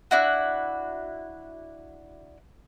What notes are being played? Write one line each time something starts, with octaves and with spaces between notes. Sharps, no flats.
D4 E4 F#4